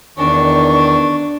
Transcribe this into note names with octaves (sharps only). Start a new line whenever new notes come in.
E2 D#3 D4 C#6